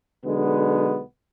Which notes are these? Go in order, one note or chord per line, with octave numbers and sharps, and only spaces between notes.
B1 D3 G#3 B3